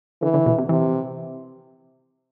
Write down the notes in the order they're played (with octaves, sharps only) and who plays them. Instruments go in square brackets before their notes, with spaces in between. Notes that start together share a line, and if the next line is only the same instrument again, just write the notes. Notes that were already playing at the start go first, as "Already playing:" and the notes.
[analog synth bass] D3 [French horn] E3
[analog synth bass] D3
B2
C3
[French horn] C3 [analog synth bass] E3